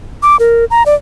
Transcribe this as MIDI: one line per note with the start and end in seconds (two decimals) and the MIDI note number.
0.23 0.36 86
0.40 0.65 70
0.71 0.83 82
0.86 0.95 74